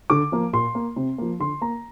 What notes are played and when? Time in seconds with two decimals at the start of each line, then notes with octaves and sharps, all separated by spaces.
0.10 D3 D6
0.32 F3 A#3
0.53 A#2 C6
0.75 A#3
0.96 C3
1.18 F3 A#3
1.40 D3 C6
1.61 A#3 A#5